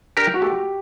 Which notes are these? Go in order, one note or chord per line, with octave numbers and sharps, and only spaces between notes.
D4 G4 A#4
F#4
A3 G4